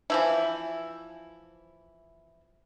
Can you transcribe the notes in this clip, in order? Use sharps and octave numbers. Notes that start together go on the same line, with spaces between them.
E3 F3 E4